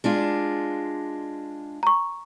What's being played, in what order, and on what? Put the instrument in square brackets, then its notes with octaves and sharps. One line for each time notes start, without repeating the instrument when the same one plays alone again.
[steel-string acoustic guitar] G#3 D4 F4
[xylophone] A#5 C#6